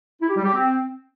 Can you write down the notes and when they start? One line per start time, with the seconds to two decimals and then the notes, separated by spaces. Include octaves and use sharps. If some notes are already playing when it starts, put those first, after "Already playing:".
0.21 E4
0.29 G4
0.37 G3
0.45 G4
0.53 C4